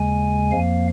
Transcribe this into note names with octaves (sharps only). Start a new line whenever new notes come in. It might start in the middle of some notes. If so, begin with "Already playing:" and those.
Already playing: D#2 C#3 G#3 G#5
F2 F3 A#3 F5